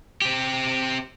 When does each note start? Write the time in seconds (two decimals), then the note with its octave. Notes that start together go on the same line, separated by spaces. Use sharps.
0.22 C4 G4